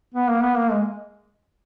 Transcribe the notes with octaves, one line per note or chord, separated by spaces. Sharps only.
B3
A#3
B3
A#3
G#3